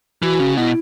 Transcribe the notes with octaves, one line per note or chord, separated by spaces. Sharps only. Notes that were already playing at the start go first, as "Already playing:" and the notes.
E3 F#4
C#3
B2 E4